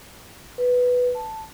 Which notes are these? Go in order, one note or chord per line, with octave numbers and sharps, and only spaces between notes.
B4
A5